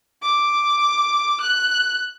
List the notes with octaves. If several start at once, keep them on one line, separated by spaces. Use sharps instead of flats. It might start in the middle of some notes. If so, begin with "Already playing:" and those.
D6
F#6